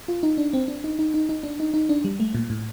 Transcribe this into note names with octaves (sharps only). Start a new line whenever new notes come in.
F4
D#4
D4
C4
D4
D#4
D#4
D#4
D#4
D4
D#4
D#4
D4
G3
A3
A#2
A2